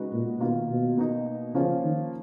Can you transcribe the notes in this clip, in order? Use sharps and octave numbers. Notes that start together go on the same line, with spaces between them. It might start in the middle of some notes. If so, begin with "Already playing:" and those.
Already playing: C#3 G#3 D#4 F#4 B4
A#2
B2 D#3 A#3 F4
B2
B2 A#3 D#4
C#3 F3 A#3 C#4 F4
D#3